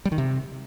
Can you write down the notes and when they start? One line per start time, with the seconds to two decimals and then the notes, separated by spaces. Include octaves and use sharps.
0.05 G3
0.12 D#3
0.18 C3